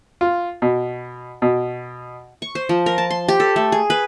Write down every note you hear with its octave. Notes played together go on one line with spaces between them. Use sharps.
F4
B2
B2
C#6
C5
F3
A#4
A5
C6
G4
A4
A3
G#4
B4